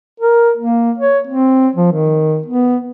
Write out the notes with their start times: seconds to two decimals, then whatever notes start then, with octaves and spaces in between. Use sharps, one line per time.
0.20 A#4
0.57 A#3
0.98 C#5
1.27 C4
1.75 F3
1.92 D#3
2.46 B3